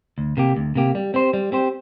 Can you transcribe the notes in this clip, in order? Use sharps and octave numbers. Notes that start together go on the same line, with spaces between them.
D2
C3 A#3 G4
D2
C3 A#3 G4
G3
C4 G4 C5
G3
C4 G4 C5